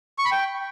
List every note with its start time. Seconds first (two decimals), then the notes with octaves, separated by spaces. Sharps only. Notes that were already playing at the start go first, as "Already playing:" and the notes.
0.18 C#6
0.25 B5
0.32 G5